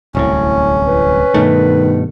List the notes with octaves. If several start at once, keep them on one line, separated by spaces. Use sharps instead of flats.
D1 C2 A2 C#4
B4
G2 B2 D#3 A3